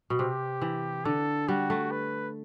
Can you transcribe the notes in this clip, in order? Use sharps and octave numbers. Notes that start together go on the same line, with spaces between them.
B2
C3 G4
E3
D3 A4
G3 F#4
A3
B4